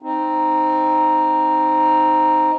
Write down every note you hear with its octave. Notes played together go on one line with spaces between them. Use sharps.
C4 D#4